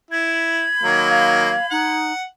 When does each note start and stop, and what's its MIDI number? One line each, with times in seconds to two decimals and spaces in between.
0.11 0.63 64
0.11 1.94 83
0.11 1.94 92
0.83 1.54 51
0.83 1.54 54
0.83 1.54 58
1.09 1.66 77
1.71 2.12 63
1.71 2.24 78